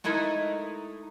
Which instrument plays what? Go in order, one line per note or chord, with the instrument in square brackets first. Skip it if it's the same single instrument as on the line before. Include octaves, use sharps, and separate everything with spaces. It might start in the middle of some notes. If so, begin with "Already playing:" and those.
[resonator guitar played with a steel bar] G#3 A3 D#4 E4 A#4